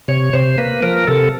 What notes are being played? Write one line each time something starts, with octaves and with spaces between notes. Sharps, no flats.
C3 C#5
C3 C5
A#3 B4
F3 A#4
C3 A4